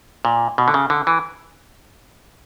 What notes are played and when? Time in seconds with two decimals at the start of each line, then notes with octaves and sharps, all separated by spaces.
0.25 A#2
0.58 B2
0.68 D3
0.74 C#3
0.90 D3
1.07 E3